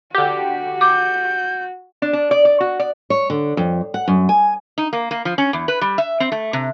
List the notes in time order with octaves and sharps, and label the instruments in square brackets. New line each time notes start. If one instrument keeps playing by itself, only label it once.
[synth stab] D3 G4 [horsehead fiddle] F#4
[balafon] D6 [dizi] G6
[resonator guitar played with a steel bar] D4
D4
D5
D5
F#4
D5
[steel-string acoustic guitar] C#5
D3
F2
F#5
F#2
G#5
[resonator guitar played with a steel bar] D#4
A#3
A#3
F3
C#4
E2
B4
G3
E5
C4
A3
C3